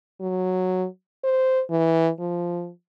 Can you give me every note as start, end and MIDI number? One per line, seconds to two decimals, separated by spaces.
0.21 0.87 54
1.24 1.62 72
1.70 2.10 52
2.20 2.71 53